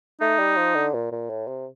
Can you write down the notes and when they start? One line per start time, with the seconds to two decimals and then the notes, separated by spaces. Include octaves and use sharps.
0.21 A3 D#4
0.39 G3
0.57 F3
0.75 D3
0.94 A#2
1.12 A#2
1.29 A2
1.47 C3